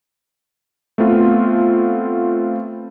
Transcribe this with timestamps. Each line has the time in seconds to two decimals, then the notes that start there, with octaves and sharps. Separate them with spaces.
0.98 A3 B3 C4 F4